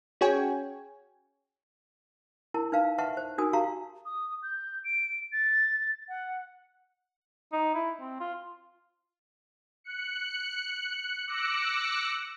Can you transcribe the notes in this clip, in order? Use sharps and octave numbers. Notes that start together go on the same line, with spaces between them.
C#4 F#4 G#4 C#5 G5 G#5
E4 A#4 A5
D#4 B4 F5 A5
B4 E5 F#5 A5 C#6
C5
D#4 F#4 A#4 G#5 D#6
F#4 G4 F5 A5 A#5 C#6
D#6
G6
D7
A6
F#5
D#4
E4
C4
F4
F#6 C#7
D6 E6 F#6 A#6 C#7